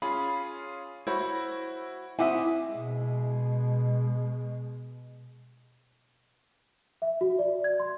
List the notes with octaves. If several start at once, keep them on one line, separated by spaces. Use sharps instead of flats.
C#4 F4 G#4 B5
E4 F#4 C5 C#5 B5
C4 E4 E5 F#5 G#5 D6 D#6
B2 G#3
E5
F#4
D5
G#6
C6